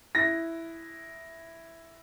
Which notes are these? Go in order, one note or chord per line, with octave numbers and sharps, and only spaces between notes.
E4 A#6